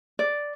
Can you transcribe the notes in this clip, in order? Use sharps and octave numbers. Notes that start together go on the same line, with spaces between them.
D5